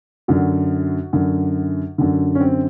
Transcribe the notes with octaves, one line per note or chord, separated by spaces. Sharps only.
F#2 D3 F#4
F#2 D3
F#2 D3
C#4
C4